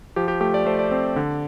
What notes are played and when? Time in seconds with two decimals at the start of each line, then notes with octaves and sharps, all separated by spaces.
0.16 F3 G4
0.28 G4
0.40 A3 G4
0.54 D5
0.66 A3 C5
0.79 D5
0.91 C4
1.16 D3